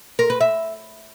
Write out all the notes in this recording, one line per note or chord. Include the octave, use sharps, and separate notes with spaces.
A#4
B4
E5